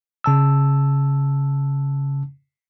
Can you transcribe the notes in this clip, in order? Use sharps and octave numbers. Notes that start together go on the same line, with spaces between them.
C#3 A5 E6